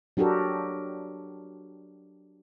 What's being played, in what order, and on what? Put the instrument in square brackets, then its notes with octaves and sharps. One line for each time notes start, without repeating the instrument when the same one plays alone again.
[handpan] F#3 D4 F#4 G4 A4 A#4